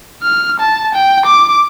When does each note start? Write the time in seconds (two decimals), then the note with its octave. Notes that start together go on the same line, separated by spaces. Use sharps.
0.22 F6
0.60 A5
0.95 G5
1.26 D6